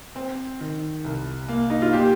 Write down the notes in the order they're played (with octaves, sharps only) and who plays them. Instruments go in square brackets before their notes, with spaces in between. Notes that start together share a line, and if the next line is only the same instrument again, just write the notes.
[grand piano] C4
D#3
C2
A#3
[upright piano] D#4
F4
[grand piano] A#2 [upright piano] G4